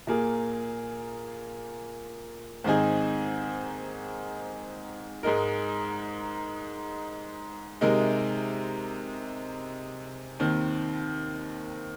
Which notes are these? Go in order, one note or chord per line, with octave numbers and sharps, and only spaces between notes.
A#2 A#3 G#4
G#2 D#3 C4 D#4 G#4
G#2 G#3 D#4 A#4
C3 G#3 D#4 A#4
D#2 D#3 C4